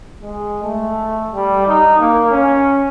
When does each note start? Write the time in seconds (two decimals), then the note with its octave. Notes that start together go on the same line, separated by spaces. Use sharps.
0.22 G#3
0.63 A3
1.32 G3
1.67 D#4
1.99 A#3
2.31 C#4